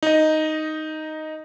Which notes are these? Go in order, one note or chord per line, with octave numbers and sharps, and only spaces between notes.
D#4 D#5